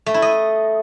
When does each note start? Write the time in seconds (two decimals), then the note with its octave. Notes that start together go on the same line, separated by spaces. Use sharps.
0.06 A3
0.14 E4
0.22 D#5